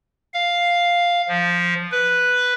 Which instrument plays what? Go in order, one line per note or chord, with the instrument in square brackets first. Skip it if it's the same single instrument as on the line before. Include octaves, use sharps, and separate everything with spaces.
[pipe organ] F5
F3
B4